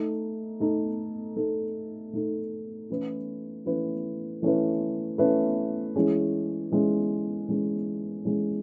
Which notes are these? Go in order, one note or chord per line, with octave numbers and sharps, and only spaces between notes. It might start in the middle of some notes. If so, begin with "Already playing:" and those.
Already playing: A3 D#4 A4
A3 D#4 A4
A3 D#4 A4
A3 D#4 A4
E3 A3 C#4 E4 B4
E3 A3 C#4 E4 B4
E3 A3 C#4 E4 B4
E3 A3 C#4 E4 B4
E3 G#3 C#4 G#4
E3 G#3 C#4 G#4
E3 G#3 C#4 G#4
E3 G#3 C#4 G#4